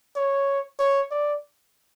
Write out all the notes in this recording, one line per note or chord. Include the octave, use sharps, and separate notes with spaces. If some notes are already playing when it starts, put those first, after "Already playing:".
C#5
C#5
D5